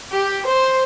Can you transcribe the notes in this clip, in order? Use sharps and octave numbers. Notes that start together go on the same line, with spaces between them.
G4
C5